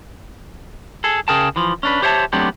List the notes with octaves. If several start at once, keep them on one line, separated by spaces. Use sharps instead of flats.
G#4 A4
C#3 G#4 A#4 G5 A5
E3 F3
C#4 D4 B4
G4 C5 C#5 E5 G5 A5
F#3 A3 B3 C4 D4 G4